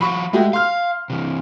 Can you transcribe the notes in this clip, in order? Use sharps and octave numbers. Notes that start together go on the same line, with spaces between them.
F3 F#4 B5 C#6
G#3 A3 F#4 G4
F5 C6 F6
C3 E3